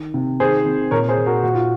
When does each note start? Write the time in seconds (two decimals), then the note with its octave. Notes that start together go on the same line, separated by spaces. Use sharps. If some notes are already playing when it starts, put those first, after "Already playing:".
Already playing: D#3
0.14 C3
0.40 D#3 G#4 C5
0.66 C3
0.91 A#2 A#4 C#5
1.09 G#4 C5
1.17 A#2
1.26 F#4 A#4
1.43 A#2 F#4
1.54 F4